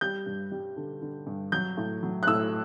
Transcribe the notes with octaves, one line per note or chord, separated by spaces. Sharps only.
G3 G6
G2
G3
D3
D3
G2
F#3 G6
A2
F#3
F#6
A2 E6